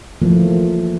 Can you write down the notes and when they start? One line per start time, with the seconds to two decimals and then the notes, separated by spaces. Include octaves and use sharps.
0.22 E3 F3 A3 A#3